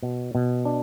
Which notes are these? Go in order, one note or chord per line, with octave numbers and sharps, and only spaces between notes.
B2
B2
D4